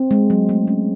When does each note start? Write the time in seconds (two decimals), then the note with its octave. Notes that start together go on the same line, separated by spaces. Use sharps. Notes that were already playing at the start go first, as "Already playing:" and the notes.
Already playing: C4
0.11 G#3
0.30 F#3
0.49 A3
0.67 C#4